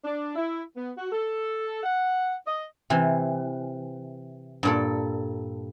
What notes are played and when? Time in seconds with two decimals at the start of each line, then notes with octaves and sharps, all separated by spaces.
0.04 D4
0.36 E4
0.77 B3
0.98 F#4
1.12 A4
1.83 F#5
2.46 D#5
2.90 C3 E3
4.63 G2 A#2 A4